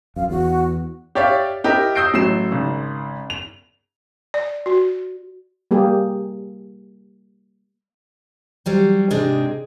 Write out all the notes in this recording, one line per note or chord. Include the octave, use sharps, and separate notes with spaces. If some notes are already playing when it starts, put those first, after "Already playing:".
F#2 F5
E2 F#4
G4 C#5 D5 E5 F5
E4 G4 A#4 D#5
D#6 E6 G6 A#6 C7 D7
A1 F#3 A3 C7 E7
G#1 C#3
F7
D5
F#4
G3 A#3 G4 G#4
F#3 G3 C5
G#2 C3 C4 D4 G#4 D#5